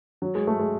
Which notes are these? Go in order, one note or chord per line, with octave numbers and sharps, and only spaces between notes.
F#3
G#3
A3
G#3